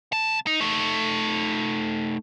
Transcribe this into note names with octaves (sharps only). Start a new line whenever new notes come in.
C2 A5
D#4
A3 D#4